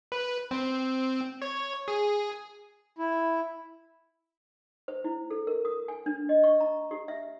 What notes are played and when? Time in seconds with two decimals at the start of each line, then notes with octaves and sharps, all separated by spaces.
0.12 B4
0.51 C4
1.42 C#5
1.88 G#4
2.98 E4
4.88 C5
5.04 E4
5.30 A4
5.47 A#4
5.65 D#6
5.88 G#5
6.06 D4
6.29 D#5
6.44 C#6
6.60 A#5
6.91 G4
7.08 E5